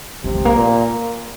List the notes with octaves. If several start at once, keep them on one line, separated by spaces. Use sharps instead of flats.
C3 G#3
G#3
A#3
A#2